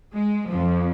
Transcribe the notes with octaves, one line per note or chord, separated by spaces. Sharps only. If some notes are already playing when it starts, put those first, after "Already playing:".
G#3
F2 F3